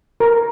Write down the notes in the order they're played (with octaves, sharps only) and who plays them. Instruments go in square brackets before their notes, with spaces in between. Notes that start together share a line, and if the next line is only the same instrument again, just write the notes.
[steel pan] A#4